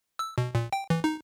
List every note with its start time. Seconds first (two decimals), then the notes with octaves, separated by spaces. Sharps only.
0.19 E6
0.38 B2
0.55 A#2
0.73 G5
0.90 E3
1.04 D#4